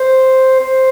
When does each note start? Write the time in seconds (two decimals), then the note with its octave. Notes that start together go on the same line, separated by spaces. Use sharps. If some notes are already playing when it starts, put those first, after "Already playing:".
Already playing: C5
0.60 C5